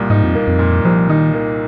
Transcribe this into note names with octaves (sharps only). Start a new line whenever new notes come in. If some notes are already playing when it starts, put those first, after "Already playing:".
Already playing: C2 A#2 A#3
G#2 D#4
F2
A#3
F2
A#2
C2 F3
D#3 D#4
A#3